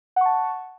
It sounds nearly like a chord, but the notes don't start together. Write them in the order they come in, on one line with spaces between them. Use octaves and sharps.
F#5 C#6 A5